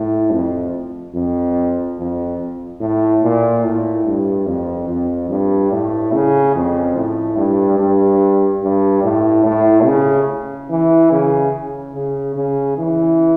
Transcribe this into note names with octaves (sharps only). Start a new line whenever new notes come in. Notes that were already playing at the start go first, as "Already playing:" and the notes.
Already playing: A2
F2
F2
F2
A2
A#2
A2
G2
F2
F2
G2
A2
C#3
F2
A2
G2
G2
G2
A2
A2
C#3
E3
C#3
C#3
C#3
E3